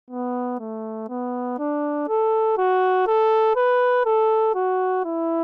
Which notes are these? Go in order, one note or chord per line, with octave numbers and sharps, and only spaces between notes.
B3
A3
B3
D4
A4
F#4
A4
B4
A4
F#4
E4